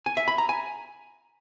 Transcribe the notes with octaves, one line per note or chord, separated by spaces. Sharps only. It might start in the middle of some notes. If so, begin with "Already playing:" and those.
G#5
E5
B5
A#5
G#5